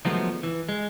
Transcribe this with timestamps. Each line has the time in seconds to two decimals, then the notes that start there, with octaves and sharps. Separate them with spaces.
0.05 D#3 F3 F#3 G#3 A3 B3
0.43 E3
0.69 G#3